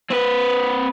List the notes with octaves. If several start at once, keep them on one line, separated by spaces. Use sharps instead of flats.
C4 B4